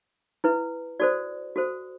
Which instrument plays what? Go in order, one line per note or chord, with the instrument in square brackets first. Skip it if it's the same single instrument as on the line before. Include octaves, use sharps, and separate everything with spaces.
[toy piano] E4 B4
F#4 A4 C5 D5
F#4 A4 C5